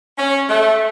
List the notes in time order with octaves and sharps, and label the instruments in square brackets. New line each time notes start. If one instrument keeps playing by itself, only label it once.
[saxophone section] C#4
A3